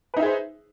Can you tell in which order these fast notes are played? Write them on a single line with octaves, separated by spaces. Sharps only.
B4 D#4 E5 G#4 C5